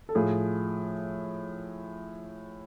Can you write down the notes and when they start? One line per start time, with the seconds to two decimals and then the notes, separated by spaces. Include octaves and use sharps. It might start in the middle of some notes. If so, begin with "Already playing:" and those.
0.09 A4
0.15 A2 F3 G#4